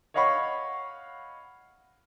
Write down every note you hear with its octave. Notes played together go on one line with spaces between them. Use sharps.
C#5 D#5 F5 F#5 B5 C#6